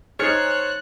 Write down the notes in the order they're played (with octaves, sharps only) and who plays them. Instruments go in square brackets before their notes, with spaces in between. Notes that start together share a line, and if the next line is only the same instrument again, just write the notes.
[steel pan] D#4 G#4 [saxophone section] C5 C#5 [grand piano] F6 A6 C#7 [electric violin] F#6